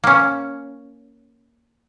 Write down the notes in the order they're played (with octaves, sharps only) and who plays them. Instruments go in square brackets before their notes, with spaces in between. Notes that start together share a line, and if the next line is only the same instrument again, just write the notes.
[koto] A#3 C#4